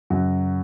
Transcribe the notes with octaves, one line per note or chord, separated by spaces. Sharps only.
F#2 C#3 F#3 F#4